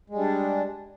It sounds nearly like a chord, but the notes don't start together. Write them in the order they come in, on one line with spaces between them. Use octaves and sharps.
G#3 G3 D4